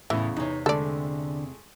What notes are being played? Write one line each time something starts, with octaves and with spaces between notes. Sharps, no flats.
E2 A2 C#3 E3
E2 C3 D#4 C#5
D3 G#3 A3 A4 D5